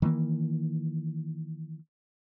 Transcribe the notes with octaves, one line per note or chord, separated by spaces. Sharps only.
D#3 E3 G3 A#3